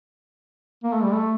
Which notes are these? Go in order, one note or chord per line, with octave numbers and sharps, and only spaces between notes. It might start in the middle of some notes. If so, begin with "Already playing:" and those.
A#3
A3
G3
A3